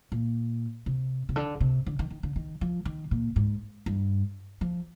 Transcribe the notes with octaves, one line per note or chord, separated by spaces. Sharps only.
A#2
C3
C3
D3
C3
D3
D#3
D#3
D3
D#3
F3
D#3
A#2
G#2
G2
F3